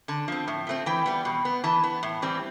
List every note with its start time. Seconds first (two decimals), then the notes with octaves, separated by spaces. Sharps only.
0.08 D3 A5
0.28 F3 C4
0.48 A2
0.67 F3 A3 C4
0.86 E3 G5
1.06 G3 B3
1.25 B2
1.45 B3
1.64 E3 A5
1.83 B3
2.03 A2
2.22 E3 G3 C4